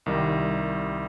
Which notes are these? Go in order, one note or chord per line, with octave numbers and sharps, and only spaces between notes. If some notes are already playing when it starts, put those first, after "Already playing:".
C2 D#3 G3